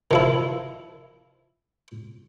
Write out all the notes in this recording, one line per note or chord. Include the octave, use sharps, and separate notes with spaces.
D#3 F3 E4